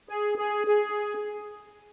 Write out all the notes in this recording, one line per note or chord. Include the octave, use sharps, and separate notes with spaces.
G#4
G#4
G#4